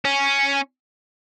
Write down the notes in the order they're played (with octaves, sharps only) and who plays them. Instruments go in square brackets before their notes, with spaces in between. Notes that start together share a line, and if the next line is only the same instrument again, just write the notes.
[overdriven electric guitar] C#4